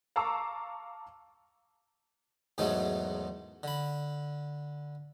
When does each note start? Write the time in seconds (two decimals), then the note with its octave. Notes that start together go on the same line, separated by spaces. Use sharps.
0.16 F5 A5 A#5 C#6 D6 E6
2.58 E2 G#2 D#3 F#3 G#3 A3
3.63 D3 B5